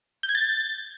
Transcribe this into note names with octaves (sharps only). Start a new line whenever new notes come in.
G6
G#6
A6